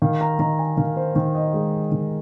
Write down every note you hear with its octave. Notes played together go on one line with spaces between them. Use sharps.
D#3 F5
A#5
D#3 A#5
G#5
D#3 F5
C5
D#3
D#5
G#3
D#3